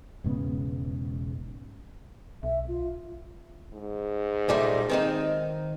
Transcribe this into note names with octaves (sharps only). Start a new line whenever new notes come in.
E1 G#2 C#3 B3
B1 E5
F4
G#2
A#2 G3 A3
D#3 C4 D#4